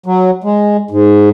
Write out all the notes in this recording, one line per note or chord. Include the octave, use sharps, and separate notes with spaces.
F#3
G#3
G#2